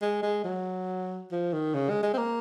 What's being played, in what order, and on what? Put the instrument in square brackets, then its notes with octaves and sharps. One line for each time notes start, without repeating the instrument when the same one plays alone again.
[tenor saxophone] G#3
G#3
F#3
F3
D#3
C#3
G#3
G#3
C4
A#3